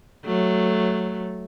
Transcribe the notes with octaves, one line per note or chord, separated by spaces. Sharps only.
F#3 A3